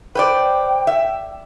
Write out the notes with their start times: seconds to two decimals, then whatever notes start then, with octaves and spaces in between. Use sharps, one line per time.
0.15 B4 C5 D5 G5
0.87 E5